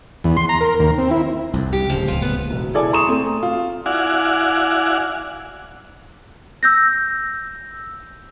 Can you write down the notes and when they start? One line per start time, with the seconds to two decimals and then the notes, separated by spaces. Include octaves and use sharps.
0.24 E2
0.37 C6
0.49 A#5
0.61 A#4
0.79 D#2
0.98 C4
1.11 E4
1.53 C2 F2
1.73 G4
1.90 D1 C#2 F3
2.08 F4
2.22 B3
2.50 E1
2.74 E4 G#4 A4 D5 G#5
2.93 A#5 C6 C#6 D#6 E7
3.09 A3 C4
3.43 F4
3.86 E4 F#4 D5 F5 F#5 G#5
6.63 E6 G6 A#6